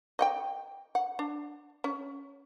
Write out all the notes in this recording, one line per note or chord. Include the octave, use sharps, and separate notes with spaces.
D#5 F#5 G5
F#5
D4
C#4